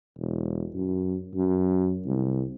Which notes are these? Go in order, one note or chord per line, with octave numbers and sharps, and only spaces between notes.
E1
F#2
F#2
C2